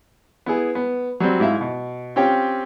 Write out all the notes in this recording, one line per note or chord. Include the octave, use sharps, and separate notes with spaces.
B3 E4 G#4
B3
F#3 G3 C4
G#2 E4 E5 F5
B2
C4 C#4 F4 G4 C#5 G5